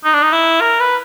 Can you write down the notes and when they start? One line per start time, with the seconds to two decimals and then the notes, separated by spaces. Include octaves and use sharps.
0.05 D#4
0.14 D4
0.22 D#4
0.33 E4
0.61 A#4
0.80 B4